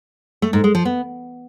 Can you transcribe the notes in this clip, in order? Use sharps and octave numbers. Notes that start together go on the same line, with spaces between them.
A3
G#2
G#3
F3
B3